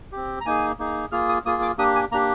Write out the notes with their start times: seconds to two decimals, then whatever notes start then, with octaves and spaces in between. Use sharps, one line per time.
0.12 C4 G4
0.41 A#5
0.46 A#3 D#4 G#4 G#5
0.79 A#3 D#4 G#4
1.12 A#3 F4 G#4 F6
1.29 D#6
1.45 A#3 F4 G#4 D#6
1.62 D6
1.78 A#3 D4 G4 D#6
1.95 G#5
2.11 A#3 D4 G4 A#5